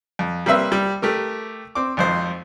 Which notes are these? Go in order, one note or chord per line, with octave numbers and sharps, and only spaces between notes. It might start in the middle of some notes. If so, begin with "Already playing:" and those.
F2
G3 A#3 C4 B4 E5
G3
A3 G4 A#4
C4 D6
G#1 F2 C5